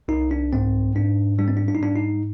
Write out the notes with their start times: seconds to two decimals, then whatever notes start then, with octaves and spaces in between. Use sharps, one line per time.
0.08 C2 D#4
0.31 D4
0.53 G#2 C4
0.95 G#2 D4
1.38 G3 D4
1.48 C4
1.57 D4
1.68 D4
1.75 D#4
1.81 G#2 D4
1.96 D#4